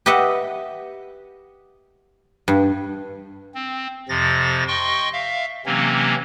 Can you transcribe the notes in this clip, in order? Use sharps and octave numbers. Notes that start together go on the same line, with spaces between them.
G4 B4 D#5 E5 F#5
G2
C4
F2 C3 F3 A6 A#6
D#5 G5 C6 C#6
E5 F5
C3 E3 F#3 A#3 C4 C#4